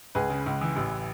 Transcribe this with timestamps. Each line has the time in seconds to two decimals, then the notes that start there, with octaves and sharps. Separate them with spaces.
0.15 C#2 G#4 B4
0.30 C#3
0.46 C#2
0.61 E3
0.76 A1